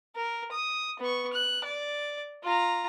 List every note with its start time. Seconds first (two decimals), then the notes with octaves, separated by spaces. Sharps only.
0.15 A#4
0.52 D#6
0.99 B3 C#6
1.33 F#6
1.64 D5
2.43 F4 A#5